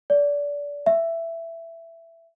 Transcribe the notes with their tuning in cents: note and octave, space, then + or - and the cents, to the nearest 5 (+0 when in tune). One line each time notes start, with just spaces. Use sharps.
D5 -25
E5 +10